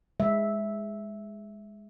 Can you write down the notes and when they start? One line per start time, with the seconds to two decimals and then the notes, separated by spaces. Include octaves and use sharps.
0.20 G#3 E5